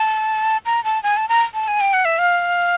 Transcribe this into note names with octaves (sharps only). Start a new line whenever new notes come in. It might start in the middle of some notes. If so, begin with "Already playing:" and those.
Already playing: A5
A#5
A5
G#5
A5
A#5
A5
G#5
G5
F#5
E5
F5